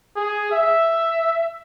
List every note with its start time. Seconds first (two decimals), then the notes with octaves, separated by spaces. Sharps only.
0.16 G#4
0.52 E5